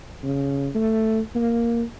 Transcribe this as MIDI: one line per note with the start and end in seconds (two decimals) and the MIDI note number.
0.23 0.68 49
0.75 1.19 57
1.35 1.83 58